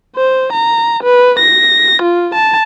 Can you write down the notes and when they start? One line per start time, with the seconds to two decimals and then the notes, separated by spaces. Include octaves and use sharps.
0.16 C5
0.52 A#5
1.03 B4
1.39 A#6
2.02 F4
2.35 A5